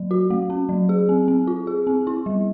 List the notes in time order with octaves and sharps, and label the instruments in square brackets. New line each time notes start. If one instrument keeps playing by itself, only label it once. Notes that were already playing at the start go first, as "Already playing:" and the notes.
Already playing: [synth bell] F#3
F#4
A3
C#4
F#3
G#4
C4
C4
F4
G#4
C4
E4
G3